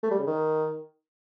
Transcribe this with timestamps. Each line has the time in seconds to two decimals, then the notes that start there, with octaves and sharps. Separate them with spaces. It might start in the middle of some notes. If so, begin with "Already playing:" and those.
0.03 A3
0.11 G3
0.19 C#3
0.27 D#3